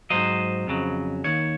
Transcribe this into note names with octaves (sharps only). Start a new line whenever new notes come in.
G#2 F#3 C5 D#5
F2 C#3 F#3
D#2 D#3 C#5